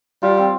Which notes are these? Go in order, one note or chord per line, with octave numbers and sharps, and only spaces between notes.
G3 F4
C4